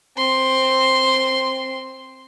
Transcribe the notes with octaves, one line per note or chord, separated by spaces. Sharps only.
C4 C6